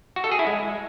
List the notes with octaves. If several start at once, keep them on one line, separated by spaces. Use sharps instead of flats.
F#4
A4
G#4
E4
G#3